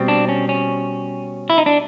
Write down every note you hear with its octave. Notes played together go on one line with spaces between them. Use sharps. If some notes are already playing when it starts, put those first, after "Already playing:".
Already playing: B2 G3 C4
D4
C#4
C#4
E4
D#4
D4